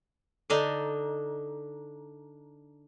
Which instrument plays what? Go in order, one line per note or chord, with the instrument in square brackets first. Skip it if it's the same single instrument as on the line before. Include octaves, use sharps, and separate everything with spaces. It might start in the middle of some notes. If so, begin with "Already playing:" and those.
[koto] D3 D4 D#4